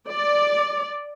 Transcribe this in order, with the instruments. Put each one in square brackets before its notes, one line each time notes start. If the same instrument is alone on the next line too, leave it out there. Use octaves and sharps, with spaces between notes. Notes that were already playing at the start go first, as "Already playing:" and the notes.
[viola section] D5